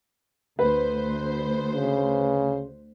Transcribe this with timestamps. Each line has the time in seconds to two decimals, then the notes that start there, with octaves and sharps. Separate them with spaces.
0.59 D2 B4 C5
1.75 C#3